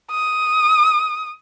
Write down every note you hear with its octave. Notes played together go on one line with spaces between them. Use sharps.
D#6